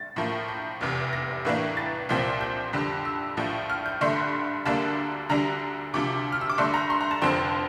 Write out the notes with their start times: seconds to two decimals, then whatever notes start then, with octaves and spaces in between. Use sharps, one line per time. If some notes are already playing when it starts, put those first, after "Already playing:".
Already playing: A6
0.16 A2 F3 A#3
0.48 G6
0.81 F1 E2 C3
1.13 A#6
1.45 A2 E3 A#3 D4
1.77 A6
2.09 C2 A#2 F3 C4
2.41 G6
2.73 F2 D3 G3
3.05 E6
3.37 A#1 A2 F3
3.70 F6
3.86 G6
4.01 G2 D3 A3 D4 C6
4.65 D2 D3 G3 A#3 D4 A5
5.29 D2 D3 G3 D4 A#5
5.94 D2 C3 F3 D6
6.32 F6
6.41 E6
6.50 D6
6.58 G2 D3 A3 D4 C6
6.74 A#5
6.90 C6
7.01 A#5
7.11 A5
7.22 F1 F2 D3 F3 C4 C6